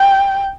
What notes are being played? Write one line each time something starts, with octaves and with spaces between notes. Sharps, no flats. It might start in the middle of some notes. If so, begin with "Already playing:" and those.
Already playing: G5